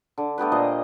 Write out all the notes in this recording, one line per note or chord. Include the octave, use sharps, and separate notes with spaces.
D3
A3 B3 G4 B4
A#2 C5 D#5 A#5